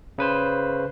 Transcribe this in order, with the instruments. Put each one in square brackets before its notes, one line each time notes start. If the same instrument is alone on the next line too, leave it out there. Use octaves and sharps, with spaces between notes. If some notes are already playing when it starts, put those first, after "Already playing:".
[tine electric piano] C#3 B4 C5